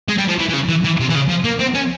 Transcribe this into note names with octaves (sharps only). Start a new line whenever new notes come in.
G#3
G3
F3
E3
E3
C#3
E3
E3
C3
E3
C#3
F3
A#3
C4
C#4